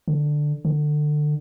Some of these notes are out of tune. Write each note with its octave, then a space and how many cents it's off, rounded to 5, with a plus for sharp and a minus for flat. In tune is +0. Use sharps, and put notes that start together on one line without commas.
D3 +10
D3 +25